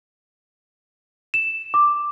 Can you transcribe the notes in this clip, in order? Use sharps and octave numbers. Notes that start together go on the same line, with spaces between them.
E7
D6